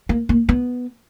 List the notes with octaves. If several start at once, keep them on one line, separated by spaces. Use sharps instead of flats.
A#3
A#3
B3